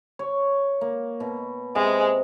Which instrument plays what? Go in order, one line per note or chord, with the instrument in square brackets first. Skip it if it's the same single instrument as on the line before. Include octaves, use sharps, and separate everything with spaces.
[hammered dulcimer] C#5
A#3
B2
[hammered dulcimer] C3 [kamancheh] G#3